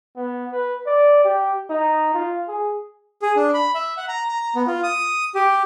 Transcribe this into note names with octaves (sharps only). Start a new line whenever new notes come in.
B3
B4
D5
G4
D#4
F4
G#4
G#4
D4
B5
E5
F#5
A#5
A#5
B3
F4
D#6
G4